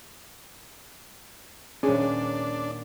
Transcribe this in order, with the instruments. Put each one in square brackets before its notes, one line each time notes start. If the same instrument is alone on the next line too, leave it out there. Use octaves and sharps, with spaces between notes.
[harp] D#1 G#5 [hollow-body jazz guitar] C#4 [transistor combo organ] D4 [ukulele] G#4 B4 C#5